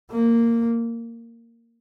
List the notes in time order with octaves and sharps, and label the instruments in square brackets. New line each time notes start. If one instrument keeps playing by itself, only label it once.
[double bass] A#3